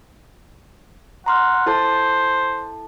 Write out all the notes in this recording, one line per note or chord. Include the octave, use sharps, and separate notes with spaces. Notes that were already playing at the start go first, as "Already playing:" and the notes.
F#5 A#5 C6 F6
E4 A4 C5 A5